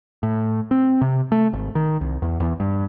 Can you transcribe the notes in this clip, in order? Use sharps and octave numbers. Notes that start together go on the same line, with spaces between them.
A2
C4
C3
A3
G#1
D#3
C2
E2
E2
G2